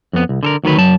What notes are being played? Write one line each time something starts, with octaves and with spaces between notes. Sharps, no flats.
F2 B3
C2
D3 A4 A#4
D2 D#3 F#3 B4
F#2 F#3 A5